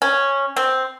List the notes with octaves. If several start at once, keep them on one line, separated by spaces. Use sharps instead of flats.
C#4
C4